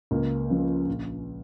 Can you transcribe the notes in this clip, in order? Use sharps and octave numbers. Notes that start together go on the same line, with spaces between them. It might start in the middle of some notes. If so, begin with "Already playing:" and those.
C#2 A#3
C#3 F3
A#1